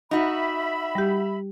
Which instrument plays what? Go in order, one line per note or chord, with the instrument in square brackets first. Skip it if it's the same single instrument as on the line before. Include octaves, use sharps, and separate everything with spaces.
[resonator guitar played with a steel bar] D#4 F#4 [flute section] E5 B5
[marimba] G3 G4